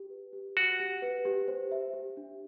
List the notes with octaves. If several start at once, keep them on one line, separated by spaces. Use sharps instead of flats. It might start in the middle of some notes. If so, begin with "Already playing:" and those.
Already playing: G4
B4
G4
F#4 F#5
G4
B4
G4
C5
E5
G4
D4